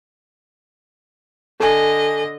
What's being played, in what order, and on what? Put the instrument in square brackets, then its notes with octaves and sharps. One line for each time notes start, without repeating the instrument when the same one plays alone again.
[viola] D3 D#5 [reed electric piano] A4 G#5